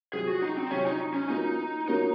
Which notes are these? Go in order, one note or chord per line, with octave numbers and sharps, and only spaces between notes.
C3 F#3 C4 F4 G#4
F#4
D#4
C4
C3 F#3 C4 C#4 F4
D#4
C#4
F3 A#3 C#4 D#4 F#4 A#4
F3 A#3 C#4 D#4 F#4 A#4